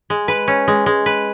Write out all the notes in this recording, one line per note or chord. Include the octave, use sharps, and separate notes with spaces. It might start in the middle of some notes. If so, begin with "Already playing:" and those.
G#3
B4
C#4
G#3
G#3
B4